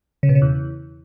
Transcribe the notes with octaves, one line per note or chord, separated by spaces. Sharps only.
C#3
B2
C#3
E2